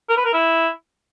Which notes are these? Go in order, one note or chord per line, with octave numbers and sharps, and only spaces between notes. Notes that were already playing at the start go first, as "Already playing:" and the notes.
A#4
B4
A#4
E4